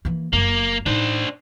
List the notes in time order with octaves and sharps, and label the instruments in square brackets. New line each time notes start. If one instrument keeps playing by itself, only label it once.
[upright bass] E3 A#3
[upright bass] F#1 F#2 [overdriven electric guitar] A#3
[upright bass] A2 D#4 [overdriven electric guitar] D4 C5